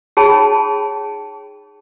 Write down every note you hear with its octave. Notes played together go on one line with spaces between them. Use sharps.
D#4 G#4 C#5 G5 A5 B5